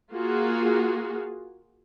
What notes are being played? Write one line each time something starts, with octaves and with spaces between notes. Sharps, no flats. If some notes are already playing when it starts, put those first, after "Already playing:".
A#3 F4 F#4 G#4